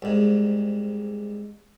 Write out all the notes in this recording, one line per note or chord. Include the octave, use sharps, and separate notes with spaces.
C2 G#2